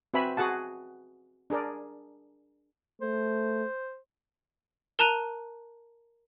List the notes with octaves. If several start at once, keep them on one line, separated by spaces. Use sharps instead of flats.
C4 F#4 B4 E5 G#5 B5
F#4 G#4 F#5 A5
D4 G#4 A#4 D5
A3 C5
A#4 A5 A#5 F#6 D#7 F7